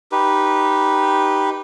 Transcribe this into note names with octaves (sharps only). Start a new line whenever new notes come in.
D#4 G4 B4